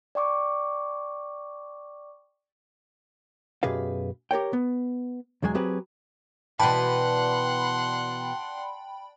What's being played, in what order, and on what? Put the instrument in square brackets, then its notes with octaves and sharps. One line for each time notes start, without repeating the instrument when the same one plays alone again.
[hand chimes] D5 G5 C#6 D6
[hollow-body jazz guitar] F#2 B2 G4 G#4 B4 F5
G4 A#4 C#5 G5
B3
B1 E2 F#3 G#3 G#5
F#3 C4 G4 G#4 B4
[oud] B2 E3 [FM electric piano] D5 G5 B5 [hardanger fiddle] F#5 C6 [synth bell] A5